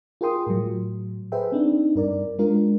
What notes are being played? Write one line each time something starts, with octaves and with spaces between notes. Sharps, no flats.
F4 G#4 A#4 G5 C6 D#6
A2 F#3
G#4 A4 B4 C5 E5 G5
C4 D4 D#4
G2 A#4 D5
G#3 D4 F4 A#4